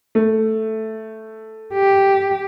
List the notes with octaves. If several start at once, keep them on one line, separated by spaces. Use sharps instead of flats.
A3
G4